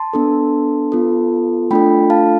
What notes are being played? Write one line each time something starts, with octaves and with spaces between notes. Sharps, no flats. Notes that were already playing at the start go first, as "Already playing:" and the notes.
Already playing: A5 C6
B3 D4 A4
B3 F4 A4
A3 D4 F4 A4 G5 B5
F5 A5